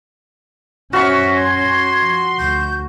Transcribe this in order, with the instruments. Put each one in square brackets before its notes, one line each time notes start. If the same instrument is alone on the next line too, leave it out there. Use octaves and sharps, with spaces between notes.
[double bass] F#2 C#4 [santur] F#4 C#6 [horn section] C5 E5 [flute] F6
[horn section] C6 [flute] G#6
[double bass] F3
[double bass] D2 [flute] G6